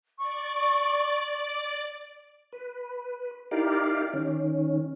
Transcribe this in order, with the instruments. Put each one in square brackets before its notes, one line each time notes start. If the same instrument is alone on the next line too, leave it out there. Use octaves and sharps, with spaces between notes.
[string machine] D5 [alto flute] C#6
[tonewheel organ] B4
D#4 E4 G4 A#4 D5 F5
D#3 C#4